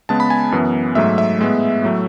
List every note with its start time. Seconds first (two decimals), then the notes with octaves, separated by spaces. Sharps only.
0.09 C#3 G#3 B3 A5
0.20 B5
0.30 G#5
0.52 F#2 E3 B3
0.95 G#2 F#3 A3 E5
1.18 E5
1.39 A2 G#3 B3
1.82 A2 F#3 A3